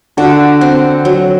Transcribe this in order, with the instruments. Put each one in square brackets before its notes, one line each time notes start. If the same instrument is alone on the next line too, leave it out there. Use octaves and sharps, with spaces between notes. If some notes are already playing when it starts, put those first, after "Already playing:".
[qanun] D3 [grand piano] D4 F#4
[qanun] C4
F#3